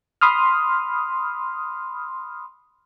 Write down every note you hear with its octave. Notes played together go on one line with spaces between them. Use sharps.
B5 C6 D#6 F6